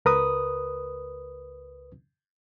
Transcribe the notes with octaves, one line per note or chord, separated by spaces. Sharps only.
C#2 A#4 B4 D#6